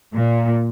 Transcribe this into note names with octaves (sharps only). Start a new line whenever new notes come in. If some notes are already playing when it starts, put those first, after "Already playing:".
A#2